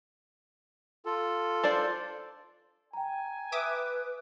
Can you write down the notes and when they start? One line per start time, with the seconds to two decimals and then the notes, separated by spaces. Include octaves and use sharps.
1.05 F4 A4
1.64 D4 C5 D5
2.93 G5 G#5 A#5
3.52 B4 E5 D6 D#6